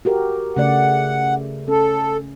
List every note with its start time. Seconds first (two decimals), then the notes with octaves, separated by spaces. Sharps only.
0.05 F#4 G4 A#4
0.56 C#3 A3 D5 F#5
1.68 C#4 A4